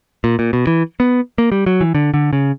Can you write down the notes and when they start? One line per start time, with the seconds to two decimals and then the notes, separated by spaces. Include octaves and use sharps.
0.24 A#2
0.39 A#2
0.53 B2
0.67 E3
1.00 B3
1.38 A#3
1.52 G3
1.66 F#3
1.81 E3
1.95 D3
2.14 D3
2.33 C#3